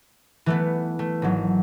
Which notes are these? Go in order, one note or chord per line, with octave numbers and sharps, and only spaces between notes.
E3 A3 B3
A3
G#1 F#3